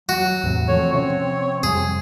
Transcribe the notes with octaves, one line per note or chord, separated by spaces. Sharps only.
F#3 F#4
E2 A2 C3
E3 F3 A3 C4 C#5
C3 F3 C#4 C#5
F2 C3 G3 G#4